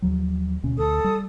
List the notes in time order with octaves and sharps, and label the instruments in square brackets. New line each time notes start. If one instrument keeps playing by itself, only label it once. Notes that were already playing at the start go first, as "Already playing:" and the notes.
[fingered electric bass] D#2 F3 F#3
D2 B2 C#4
[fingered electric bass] D2 [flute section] A4 D#6
[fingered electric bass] G3